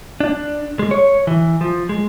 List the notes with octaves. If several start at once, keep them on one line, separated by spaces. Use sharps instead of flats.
D4
G#3
C#5
E3
F3
G#3